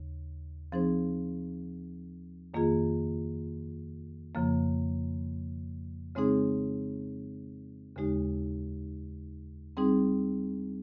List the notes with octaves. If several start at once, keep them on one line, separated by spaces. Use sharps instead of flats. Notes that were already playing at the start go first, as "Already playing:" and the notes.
Already playing: D#2 C#3
F3 C4 D#4 G#4 C5
F2 D#3 A#3 F4 G#4
F2 C#3 F3 A#3
C#3 G#3 C4 D#4 G#4
D#2 C#3 G#3 D#4 G4
G3 C4 D#4 G#4